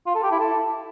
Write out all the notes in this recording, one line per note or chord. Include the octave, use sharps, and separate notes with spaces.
F4
A4
G4
E4
A4